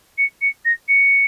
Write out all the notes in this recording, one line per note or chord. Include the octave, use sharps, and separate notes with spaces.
C#7
C#7
A#6
C#7